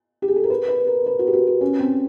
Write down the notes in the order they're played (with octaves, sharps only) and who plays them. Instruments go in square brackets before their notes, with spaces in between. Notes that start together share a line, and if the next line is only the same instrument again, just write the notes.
[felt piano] G4
G#4
A4
A#4
B4
B4
A#4
B4
F#4
G4
F#4
G4
C#4
C4